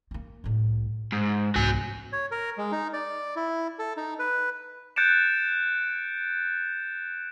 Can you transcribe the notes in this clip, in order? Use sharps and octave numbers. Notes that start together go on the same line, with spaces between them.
A#3 C4
C2 A2
G#2
C2 G#2 B3 F#4 G#5
C#5
A#4
G#3
D#4
D5
E4
A4
D#4
B4
F#6 G6 A6 C#7 D7 E7